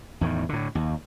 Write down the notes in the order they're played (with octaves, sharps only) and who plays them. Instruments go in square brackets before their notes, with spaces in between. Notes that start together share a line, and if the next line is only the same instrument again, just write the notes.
[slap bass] E2 A2 D#3
A2 D3
D#2